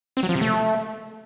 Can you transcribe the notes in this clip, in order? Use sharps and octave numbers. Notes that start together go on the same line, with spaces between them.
C4
F#3
F3
C3
A3